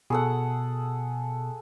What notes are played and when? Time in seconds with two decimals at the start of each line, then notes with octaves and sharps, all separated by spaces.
0.10 B2 G#4 A4 F#5